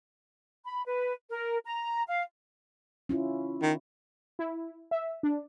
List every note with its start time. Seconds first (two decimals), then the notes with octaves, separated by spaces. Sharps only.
0.65 B5
0.85 B4
1.30 A#4
1.65 A#5
2.07 F5
3.09 C#4 E4 F4
3.62 D#3
4.39 E4
4.91 E5
5.23 D4